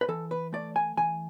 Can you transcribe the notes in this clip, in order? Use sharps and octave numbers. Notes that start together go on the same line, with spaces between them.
B4
E3 A4
B4
A3 D5
G#5
E3 G#5